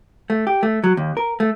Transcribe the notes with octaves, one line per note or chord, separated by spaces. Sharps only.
A3
G4
A3
F#3
D#2
A#4
A3